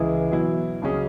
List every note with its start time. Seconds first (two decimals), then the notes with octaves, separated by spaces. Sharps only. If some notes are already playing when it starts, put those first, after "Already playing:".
Already playing: C#2 C#3 E3 G#3 E4 G#4
0.32 B2 F#3 E4
0.82 C#2 C#3 F#3 C#4 G#4